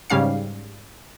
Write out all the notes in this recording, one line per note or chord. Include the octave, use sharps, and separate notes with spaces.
G#2 C#3 G3 C#4 F5 C7